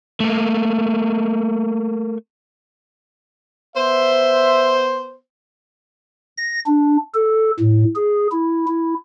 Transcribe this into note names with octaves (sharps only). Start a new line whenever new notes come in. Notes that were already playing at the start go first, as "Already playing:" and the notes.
A3 A#3
B3 C5 E5
A#6
D4
A4
A2
G#4
E4
E4